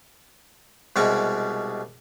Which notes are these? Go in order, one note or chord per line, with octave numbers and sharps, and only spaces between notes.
C2 B2 G3 G#3 D#5 C#6